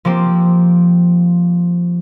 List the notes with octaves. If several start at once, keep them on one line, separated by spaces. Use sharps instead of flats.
F3 A#3 C4 G4